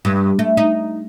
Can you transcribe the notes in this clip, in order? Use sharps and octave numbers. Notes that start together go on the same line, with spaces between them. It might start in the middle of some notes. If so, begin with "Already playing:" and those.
G2
A3
D#4